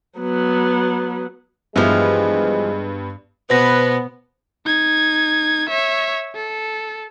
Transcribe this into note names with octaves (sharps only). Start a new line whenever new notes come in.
F#3 B3
G2 E3 F3 G#3 B3
B2 B3 B4 C5 A#6
D#4 G#6
C#5 E5
A4